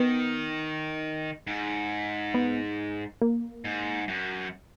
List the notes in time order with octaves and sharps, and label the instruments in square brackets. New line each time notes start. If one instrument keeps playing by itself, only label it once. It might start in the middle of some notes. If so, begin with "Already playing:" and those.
Already playing: [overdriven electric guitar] D#3 [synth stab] B3
[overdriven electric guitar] G#2
[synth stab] B3
A#3
[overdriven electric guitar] G#2
F#2